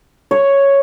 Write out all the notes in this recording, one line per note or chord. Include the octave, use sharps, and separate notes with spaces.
C#5